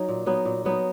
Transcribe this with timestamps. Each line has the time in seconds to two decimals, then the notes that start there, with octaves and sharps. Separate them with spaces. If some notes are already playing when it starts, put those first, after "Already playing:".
Already playing: F#3 D#4
0.08 A#2
0.26 F#3 B3 D#4
0.45 A#2
0.65 F#3 B3 D#4